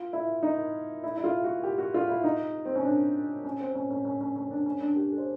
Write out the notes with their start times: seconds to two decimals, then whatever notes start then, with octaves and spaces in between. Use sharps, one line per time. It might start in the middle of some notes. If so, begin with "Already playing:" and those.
Already playing: F4
0.13 E4
0.43 D#4
1.04 E4
1.17 E4
1.24 F4
1.44 F#4
1.63 G4
1.78 F#4
1.94 F4
2.09 E4
2.24 D#4
2.65 C4
2.75 C#4
2.84 D4
3.44 C#4
3.60 C4
3.75 C#4
3.90 C#4
4.05 C#4
4.21 C#4
4.36 C#4
4.51 D4
4.66 C#4
4.81 D4
4.96 G4
5.11 A4
5.18 C5